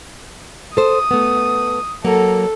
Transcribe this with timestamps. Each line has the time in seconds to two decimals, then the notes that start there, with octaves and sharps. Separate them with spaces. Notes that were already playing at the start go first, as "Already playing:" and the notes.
0.77 A4 C5 D#6
1.11 A3 B3
2.04 F#3 A#3 A4